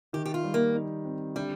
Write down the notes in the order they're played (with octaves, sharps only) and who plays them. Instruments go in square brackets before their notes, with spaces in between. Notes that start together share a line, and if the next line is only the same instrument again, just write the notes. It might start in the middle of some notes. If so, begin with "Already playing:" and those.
[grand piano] D#3 [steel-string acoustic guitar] G4
[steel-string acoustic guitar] G4
F4
[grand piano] G3
[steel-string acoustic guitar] A#3
[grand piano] D#4
C4
[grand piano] D3 [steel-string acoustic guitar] G3